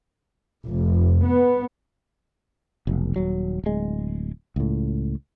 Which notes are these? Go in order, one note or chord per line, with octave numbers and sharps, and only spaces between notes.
F1
B3
F1 B1
D#1 F#3
D1 G#3
C#2 A2